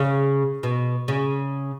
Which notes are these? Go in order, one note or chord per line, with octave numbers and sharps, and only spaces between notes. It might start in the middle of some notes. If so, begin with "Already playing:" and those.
Already playing: C#3
B2
C#3